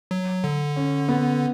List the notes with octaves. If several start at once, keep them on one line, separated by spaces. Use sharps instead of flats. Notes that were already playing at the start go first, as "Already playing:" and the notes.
F#3
D3
C#4
B3